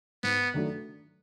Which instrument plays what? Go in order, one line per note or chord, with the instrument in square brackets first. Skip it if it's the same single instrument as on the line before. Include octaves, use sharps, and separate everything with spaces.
[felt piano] G#2 [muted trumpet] B3
[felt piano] D#3 F#3 A3 D4